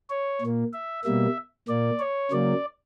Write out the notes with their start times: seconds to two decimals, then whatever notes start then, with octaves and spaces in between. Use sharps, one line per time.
0.10 C#5
0.42 A#2 A#3
0.73 E5
1.04 B2 G3 A#3 E5
1.69 A#2 A#3 D5
1.99 C#5
2.32 C#3 F#3 A#3 D5